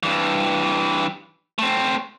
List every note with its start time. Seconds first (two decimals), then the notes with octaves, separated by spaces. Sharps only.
0.03 G2 E3
1.59 A3 C4